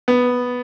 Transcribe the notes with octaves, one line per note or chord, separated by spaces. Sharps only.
B3